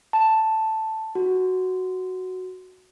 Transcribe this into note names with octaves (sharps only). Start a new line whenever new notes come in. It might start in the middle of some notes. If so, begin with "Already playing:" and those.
A5
F#4